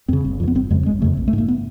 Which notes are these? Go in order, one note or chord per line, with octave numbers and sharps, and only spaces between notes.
F2 C#3 C4
G1
F2 C#3
B3
G1 C4
F2 C#3 G#3
G1 G#3
F2 C#3 A3
A#1
A3
G#2
A#3
B3